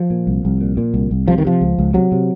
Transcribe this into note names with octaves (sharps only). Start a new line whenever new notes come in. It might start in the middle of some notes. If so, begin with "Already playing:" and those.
Already playing: F3
A#2
C2
C2
A#2
A#2
C2
C2
C3 F3
D#3
C3 F3
C#2
C#2
C3 F#3
C3